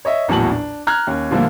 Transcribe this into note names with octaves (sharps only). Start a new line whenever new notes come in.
C#5 D#5 E5
A#1 E2 A2 F#3 A5 F#7
D4
A#5 F6 F#6 G#6
D#2 C#4
A#2 D3 F3 G3 A3 A#3